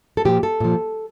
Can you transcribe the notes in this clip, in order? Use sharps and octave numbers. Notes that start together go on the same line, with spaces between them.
A4
A#2 F3 G4
A4
A#2 F3